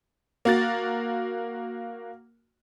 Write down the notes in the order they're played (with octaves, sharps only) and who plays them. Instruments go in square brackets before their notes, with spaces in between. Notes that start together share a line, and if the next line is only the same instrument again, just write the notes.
[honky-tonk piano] A#3 F#4 A6